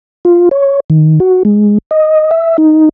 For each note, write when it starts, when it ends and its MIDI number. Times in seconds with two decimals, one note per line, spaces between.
0.25 0.49 65
0.51 0.80 73
0.90 1.19 51
1.20 1.43 66
1.45 1.78 56
1.91 2.31 75
2.31 2.57 76
2.58 2.89 63